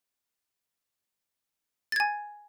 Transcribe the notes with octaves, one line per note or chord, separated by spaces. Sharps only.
G#5 G#6 A6